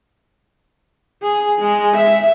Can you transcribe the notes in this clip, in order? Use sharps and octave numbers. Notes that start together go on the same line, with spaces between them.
G#4
G#3
E5